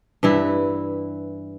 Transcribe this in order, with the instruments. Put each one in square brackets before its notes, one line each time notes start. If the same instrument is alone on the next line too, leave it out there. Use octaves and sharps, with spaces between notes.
[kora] G2 E3 E4